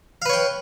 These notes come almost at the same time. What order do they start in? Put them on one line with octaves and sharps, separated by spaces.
F5 B4 C#5 G5